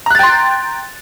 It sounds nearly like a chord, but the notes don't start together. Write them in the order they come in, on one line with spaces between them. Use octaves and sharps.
A#5 F#6 A6 G5 C6